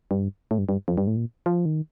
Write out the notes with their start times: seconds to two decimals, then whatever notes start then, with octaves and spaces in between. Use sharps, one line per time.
0.11 G2
0.51 A2
0.58 G2
0.69 G2
0.88 F2
0.98 G2
1.07 A2
1.17 A#2
1.46 F3
1.65 D#3